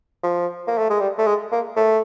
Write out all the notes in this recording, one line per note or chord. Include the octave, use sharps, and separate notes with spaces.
F3
A#3
A3
G#3
G3
A3
G#3
A#3
A3